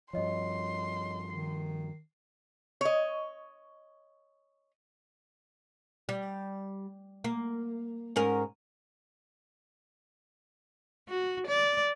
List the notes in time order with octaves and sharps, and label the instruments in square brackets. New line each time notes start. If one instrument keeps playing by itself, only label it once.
[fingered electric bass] G2 F3 [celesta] C#5 D#5 [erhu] C6
[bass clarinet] D#3 [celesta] C7
[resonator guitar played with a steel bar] C#5 D#5
[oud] G3
A#3
G#2 C#4 A#4
[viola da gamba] F#4
D5